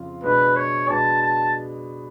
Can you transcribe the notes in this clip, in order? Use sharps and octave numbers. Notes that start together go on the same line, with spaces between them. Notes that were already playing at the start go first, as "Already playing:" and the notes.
Already playing: F2 C#3 F4
B2 G#3 D4 B4
C#5
B2 G#3 D4 A5
A5